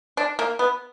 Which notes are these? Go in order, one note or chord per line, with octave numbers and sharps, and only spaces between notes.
D4
A#3
B3